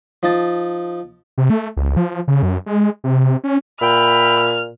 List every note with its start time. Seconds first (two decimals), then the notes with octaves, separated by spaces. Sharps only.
0.23 F3 D#4 A5
1.38 C3
1.50 A3
1.77 C#2
1.97 F3
2.28 C#3
2.43 F#2
2.66 G#3
3.04 C3
3.44 C#4
3.81 A#2 E5 G5 B5 F6